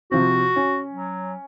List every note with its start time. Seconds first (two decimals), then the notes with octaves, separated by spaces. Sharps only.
0.12 C3 F3 C4 F#4
0.56 C#4
0.93 F#3